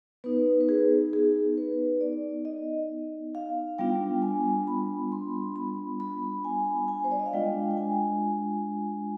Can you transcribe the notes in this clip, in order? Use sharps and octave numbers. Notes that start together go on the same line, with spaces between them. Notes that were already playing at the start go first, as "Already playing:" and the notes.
B3 D#4 B4
B4
G#4
G#4
B4
D5
D#5
F5
G3 B3 D4 F4 G5
G#5
B5
C6
B5
B5
G#5
G#5
C5
D5
D#5
F5
G#3 D4 F4 G5
G5
G#5